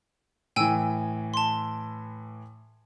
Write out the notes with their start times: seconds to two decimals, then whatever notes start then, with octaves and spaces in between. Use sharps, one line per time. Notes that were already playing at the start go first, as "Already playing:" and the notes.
0.56 A2 E3 G5 G#5 E6
1.34 A5 C6